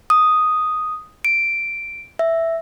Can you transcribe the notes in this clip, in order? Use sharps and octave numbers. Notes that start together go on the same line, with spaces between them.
D#6
D7
E5